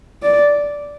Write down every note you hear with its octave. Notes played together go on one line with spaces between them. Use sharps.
D5